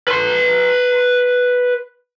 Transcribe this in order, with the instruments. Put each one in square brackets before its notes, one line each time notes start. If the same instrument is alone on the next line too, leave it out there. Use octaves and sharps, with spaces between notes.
[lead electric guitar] B4 C6